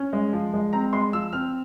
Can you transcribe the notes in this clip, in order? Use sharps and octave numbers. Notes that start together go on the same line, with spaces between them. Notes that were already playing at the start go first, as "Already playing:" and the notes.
Already playing: C#4
G#3
F3
G#3
C4 A#5
G#3 C6
F3 E6
C4 F6